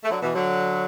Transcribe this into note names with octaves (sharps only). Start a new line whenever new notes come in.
A3
D3 F#3
B2 E3
D3 F#3